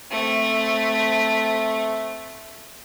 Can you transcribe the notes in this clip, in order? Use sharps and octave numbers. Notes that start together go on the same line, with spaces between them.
A3 C4